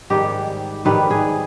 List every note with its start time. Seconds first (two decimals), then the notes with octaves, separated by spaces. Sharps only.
0.10 G#2 D#3 G3 G4
0.85 G#2 D#3 G3 B4
1.10 G#4